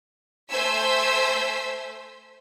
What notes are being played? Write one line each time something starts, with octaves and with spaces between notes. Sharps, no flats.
A3 C5 G#5 E6 B6